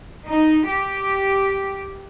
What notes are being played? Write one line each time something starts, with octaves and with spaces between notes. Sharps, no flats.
D#4
G4